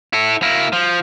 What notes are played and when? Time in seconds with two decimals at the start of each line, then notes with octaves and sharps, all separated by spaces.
0.13 E4 A4
0.42 A#3 E4
0.73 F3